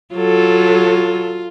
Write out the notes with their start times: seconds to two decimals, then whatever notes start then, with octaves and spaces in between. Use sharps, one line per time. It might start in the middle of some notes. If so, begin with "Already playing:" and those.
0.15 F#3 F4 A4